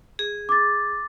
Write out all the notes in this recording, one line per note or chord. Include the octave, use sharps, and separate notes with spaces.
G#4
D6 A6